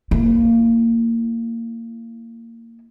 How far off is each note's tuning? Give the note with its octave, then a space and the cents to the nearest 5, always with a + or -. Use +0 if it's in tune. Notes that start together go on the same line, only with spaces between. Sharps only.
A#3 -20 E4 +15